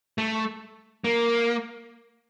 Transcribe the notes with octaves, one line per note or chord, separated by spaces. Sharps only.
A3
A#3